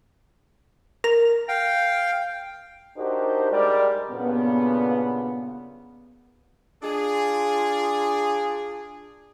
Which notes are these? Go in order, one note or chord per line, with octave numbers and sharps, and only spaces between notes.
A#4
F5 G5
D4 D#4 F#4 G4 A#4 C5
G3 G#3 G4 A#4 D5
G2 A#2 C#3 B3
D4 F4 G#4